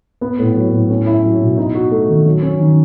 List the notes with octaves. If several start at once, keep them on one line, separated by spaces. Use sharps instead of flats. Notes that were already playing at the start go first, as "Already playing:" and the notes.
B3
A2
F#3
A2
C#4
E4
F#3
B2
D#4
F#4
A3
D#3
F#3
C#4
D#3